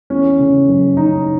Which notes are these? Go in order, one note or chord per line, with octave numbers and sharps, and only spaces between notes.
E2 C#4
C#3
F#1
C#3 D#4